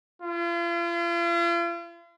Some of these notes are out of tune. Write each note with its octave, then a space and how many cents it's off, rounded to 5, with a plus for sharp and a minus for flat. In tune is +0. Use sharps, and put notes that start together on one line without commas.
F4 -40